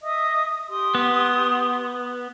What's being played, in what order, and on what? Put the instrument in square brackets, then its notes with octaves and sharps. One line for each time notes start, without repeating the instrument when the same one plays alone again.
[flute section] D#5 E5 D#6
G4 C6 D#6
[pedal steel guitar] B3